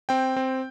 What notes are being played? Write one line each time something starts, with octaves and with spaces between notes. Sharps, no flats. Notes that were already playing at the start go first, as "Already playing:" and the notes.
C4 G5
C4